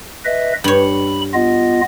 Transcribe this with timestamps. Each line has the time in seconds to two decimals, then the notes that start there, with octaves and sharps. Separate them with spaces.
0.25 B4 D#5 E5
0.64 G2 C#5 B5
1.34 B3 F4 D#5